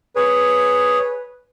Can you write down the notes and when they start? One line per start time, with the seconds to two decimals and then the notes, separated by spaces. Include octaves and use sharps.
0.16 G#4 B4 C#5